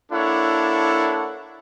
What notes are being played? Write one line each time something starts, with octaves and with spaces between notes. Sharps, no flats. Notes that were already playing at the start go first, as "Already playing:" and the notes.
A#3 D4 E4 A4 C#5 F#5